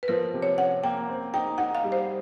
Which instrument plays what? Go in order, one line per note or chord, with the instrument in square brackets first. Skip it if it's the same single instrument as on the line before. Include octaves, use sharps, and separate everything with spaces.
[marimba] B4
[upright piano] F3 [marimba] A#4
[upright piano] C3
[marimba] C#5
[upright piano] C#4 [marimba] F#5
[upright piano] A#3 [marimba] G5
[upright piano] C4
[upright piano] D#4 [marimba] G5
[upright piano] D#4 [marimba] F#5
[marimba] F5
[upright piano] G3
[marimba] C5